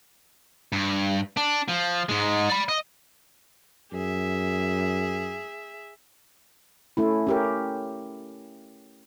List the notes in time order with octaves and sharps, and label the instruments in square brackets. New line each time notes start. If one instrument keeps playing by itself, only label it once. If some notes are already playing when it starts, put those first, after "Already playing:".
[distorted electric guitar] G2
D4
F3
G#2 G#3
D5 B5
D#5
[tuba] F#2 [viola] G#4 E5
[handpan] A3 C#4 E4
C#4 G4 A#4